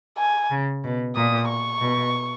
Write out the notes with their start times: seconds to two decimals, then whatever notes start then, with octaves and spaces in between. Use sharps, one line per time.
0.18 G#5
0.51 C#3
0.83 B2
1.15 A#2 D#6
1.49 C#6
1.81 B2